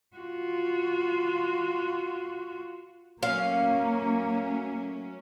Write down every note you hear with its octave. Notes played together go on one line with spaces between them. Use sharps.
F4 F#4
F#3 A3 A#3 C#4 F5